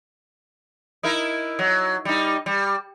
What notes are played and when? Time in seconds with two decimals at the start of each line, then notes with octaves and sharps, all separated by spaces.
1.03 D#4 E4 A#4
1.59 F#3
2.05 G3 D#4
2.46 G3